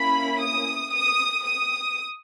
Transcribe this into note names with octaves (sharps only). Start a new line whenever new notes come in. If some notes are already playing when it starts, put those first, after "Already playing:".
Already playing: A#3 C#4 E4 B5
D#6
D#6
D#6